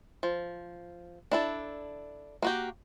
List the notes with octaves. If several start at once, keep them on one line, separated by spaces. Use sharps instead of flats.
F3
D4 E4 A4
A#3 F#4 G4